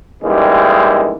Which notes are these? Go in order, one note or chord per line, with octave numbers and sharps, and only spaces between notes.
A1 D#2 G3 G#3